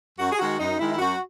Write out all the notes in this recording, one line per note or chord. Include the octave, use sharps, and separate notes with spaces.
F#2 F#4
G#4
D#3 G#3 F#4
F#2 D#4
D#3 G#3 E4
E4
F#2 F#4